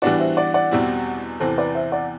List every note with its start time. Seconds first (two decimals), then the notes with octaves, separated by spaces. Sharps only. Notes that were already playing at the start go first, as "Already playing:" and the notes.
0.02 E3 G3 B3 D4 F#4 D5 F#5
0.19 C5 E5
0.37 D5 F#5
0.54 D5 F#5
0.71 E2 B2 G3 C4 E4
1.40 E2 C3 E3 A4 C5
1.58 B4 D5
1.75 C5 E5
1.92 D5 F#5